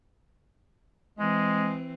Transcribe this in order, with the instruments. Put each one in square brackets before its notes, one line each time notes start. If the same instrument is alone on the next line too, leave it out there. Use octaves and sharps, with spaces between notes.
[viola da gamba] E3 C4 [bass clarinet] G#3